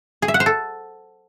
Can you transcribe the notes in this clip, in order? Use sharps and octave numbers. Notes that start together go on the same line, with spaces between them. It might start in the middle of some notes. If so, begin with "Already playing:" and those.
G#4
E5
F#5
C5
A4